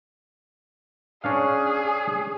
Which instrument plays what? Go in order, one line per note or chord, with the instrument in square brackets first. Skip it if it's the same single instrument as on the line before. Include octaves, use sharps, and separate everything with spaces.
[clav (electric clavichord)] C#4 D4 F5 [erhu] G#4